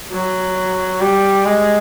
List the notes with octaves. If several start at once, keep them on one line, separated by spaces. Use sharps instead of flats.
F#3
G3
G#3